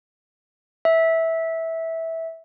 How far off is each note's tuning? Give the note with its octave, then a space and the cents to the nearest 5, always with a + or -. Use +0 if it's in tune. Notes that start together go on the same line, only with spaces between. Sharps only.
E5 -15